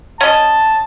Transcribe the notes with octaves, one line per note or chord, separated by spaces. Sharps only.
C#4 D#5 A5